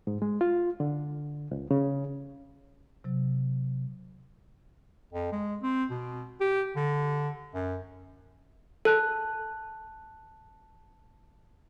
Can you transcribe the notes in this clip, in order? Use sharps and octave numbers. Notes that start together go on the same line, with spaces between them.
G#2
G#3
F4
D3
C#2
C#3
C3 F#3
F2
G#3
C4
B2
G4
D3
F#2
A4 A5 F#6